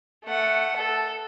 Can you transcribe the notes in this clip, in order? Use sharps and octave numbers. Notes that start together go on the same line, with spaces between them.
A3 F#5
A4